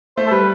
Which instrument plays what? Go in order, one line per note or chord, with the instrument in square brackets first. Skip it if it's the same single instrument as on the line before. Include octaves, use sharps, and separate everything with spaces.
[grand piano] A3 [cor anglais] C5
[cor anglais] A4
[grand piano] G3 [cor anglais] B4